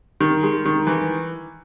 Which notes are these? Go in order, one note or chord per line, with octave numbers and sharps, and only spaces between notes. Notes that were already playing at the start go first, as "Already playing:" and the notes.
D#3
G#3
D#3
E3